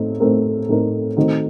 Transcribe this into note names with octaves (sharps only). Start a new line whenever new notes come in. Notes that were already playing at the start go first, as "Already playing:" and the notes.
Already playing: A2 A3 C4 D#4
A2 A3 C4 D#4 A#4
A2 A3 C4 D#4 A#4
D#3 A3 C4 D#4 F#4